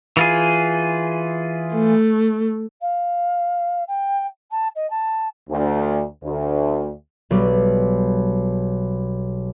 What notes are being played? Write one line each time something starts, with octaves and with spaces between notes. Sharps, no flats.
E3 F4 G#4
A3
F5
G5
A5
D#5
A5
D2
D2
B1 G3